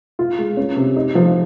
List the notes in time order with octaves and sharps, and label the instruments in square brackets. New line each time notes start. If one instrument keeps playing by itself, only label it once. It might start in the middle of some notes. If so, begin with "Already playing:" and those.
[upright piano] F4
G#3
C#4
C3
D#4
F3